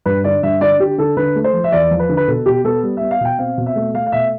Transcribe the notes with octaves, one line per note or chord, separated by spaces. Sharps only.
G2 B4
D3 D5
G2 E5
D3 D5
D3 G4
D3 A4
D3 B4
A3
C5
F3
E5
E2 D5
F3
B4
D3
B4
B2 A4
B2 G4
B3 A4
G3
B3 E5
F5
B2 G5
C4 F5
B2
E5
A3
A3 F5
F5
B2 E5